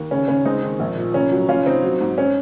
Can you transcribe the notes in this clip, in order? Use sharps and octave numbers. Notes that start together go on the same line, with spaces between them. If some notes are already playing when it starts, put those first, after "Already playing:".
Already playing: D#2
C#3 C#4
C#3 C#4
G#3 C4 D#4
D#3
A#1
A#2
F1 C#4
F#3
F1 C#4 F4
F1 C4 D#4
F#3
G#2
C#4